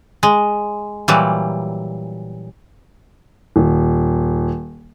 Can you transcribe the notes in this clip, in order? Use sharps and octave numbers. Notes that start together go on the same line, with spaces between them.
G#3
A#2 E3 F#3 G3
D#1